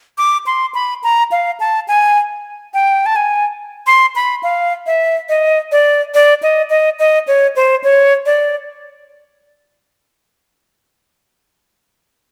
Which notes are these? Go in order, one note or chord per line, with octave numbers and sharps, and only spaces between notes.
D6
C6
B5
A#5
F5
A5
G#5
G5
A5
G#5
C6
B5
F5
E5
D#5
D5
D5
D#5
D#5
D#5
C#5
C5
C#5
D5